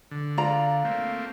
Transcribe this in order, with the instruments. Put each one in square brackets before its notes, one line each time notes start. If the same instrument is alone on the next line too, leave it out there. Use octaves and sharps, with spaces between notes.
[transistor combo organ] D3
[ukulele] F4 D5 A#5
[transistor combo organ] A3 A#3 C4